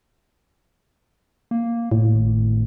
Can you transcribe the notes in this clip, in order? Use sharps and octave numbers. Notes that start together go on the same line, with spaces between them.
A#3
F#1 A2
G#1